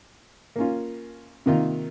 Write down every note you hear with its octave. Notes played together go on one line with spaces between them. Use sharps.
A#3 C#4 F4
C3 D#3 A#3 F4